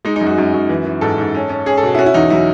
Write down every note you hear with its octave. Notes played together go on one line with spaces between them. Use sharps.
G#3 D#4
D#4
F#2
F#4
F#2
F#2
E3
E3
G#2 A4
G#2
C#4
C#4
C#4 G#4
A4
B2
E4
C#4 F#4
E4
E2 D#4
F#3 E4